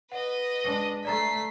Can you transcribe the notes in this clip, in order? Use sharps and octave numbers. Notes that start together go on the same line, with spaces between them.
B4 D#5 F#5
G#3 D4
A3 D5 A#5 A6 B6 C7